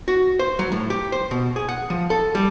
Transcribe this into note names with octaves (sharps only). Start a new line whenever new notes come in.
F#4
C5
F#3
A2
G4
C5
B2
G#4
F#5
F3
A4
G3